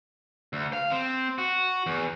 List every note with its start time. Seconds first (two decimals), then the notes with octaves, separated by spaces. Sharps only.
0.53 D2
0.73 F5
0.91 C4
1.38 F#4
1.86 E2